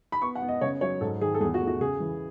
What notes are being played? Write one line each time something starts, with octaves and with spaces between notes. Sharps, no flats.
B5
B3 C#6
F#5
B3
D#5
C#3 C#5
F#3 C#5
G#2 A4
D#3 G#4
A4
E2 G#4
F#4
A3
F#4
C#3 G#4
E3